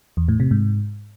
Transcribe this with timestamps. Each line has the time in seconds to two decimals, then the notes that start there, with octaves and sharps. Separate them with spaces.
0.17 E2
0.28 A2
0.40 C3
0.51 G#2